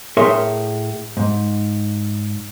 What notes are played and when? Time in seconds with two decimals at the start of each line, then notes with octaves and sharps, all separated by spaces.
0.17 A2 G#4 A#4 C#5 E5 C6
1.17 G#2